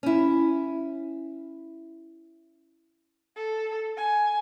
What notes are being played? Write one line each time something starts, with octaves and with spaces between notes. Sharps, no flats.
C#4 E4
A4
G#5